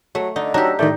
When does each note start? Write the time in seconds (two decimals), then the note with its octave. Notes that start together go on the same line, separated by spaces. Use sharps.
0.15 F#3 A3
0.36 D3 D#4
0.54 F#3 D4 D#4 G4 A#5 E6
0.79 A2 D#3 A3 D#4 D5 G6